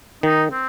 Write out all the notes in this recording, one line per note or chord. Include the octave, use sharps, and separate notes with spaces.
D#3 D#4
C4